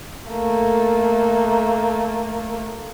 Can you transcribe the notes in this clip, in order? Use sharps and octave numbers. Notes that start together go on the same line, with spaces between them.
A3 A#3